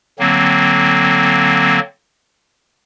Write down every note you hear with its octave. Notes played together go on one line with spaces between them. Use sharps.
D3 F#3 A#3 C4